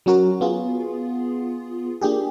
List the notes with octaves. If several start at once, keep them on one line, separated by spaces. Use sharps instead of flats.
F#3 C#4 F#4 A#4
B3 F4 G#4
A#3 D4 G4 G#4